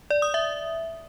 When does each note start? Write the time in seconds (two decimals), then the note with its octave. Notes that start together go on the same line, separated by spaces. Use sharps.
0.10 D5
0.22 D#6
0.34 E5